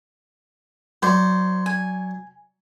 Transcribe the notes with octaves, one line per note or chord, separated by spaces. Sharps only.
F#3 C5 D5
G#5